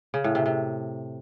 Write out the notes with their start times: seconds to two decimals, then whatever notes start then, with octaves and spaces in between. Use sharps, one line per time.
0.14 C#3
0.24 A2
0.35 C3
0.46 C3